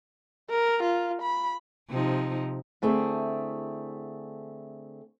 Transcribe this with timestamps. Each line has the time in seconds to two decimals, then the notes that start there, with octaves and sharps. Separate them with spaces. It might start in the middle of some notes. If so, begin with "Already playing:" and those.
0.50 A#4
0.83 F4
1.22 B5
1.90 C3 F3 D#4
2.82 D3 A3 C4 E4 G#4